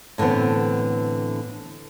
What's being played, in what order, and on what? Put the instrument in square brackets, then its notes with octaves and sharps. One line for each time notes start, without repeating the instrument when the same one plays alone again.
[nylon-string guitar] A2 D3 E3 B3 C4